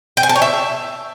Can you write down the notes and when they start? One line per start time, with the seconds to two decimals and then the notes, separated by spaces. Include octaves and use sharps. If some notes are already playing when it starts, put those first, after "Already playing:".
0.17 G5
0.23 G#5
0.29 A5
0.36 C#5
0.42 E5